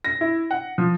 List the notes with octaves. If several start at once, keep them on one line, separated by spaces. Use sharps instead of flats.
A#6
E4
F#5
F3